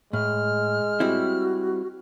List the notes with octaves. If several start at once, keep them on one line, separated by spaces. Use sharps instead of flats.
A2 G#3 F6
G3 C4 E4 F#4